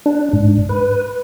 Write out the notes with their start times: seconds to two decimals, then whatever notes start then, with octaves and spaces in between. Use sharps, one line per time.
0.06 D4
0.33 G#2
0.69 B4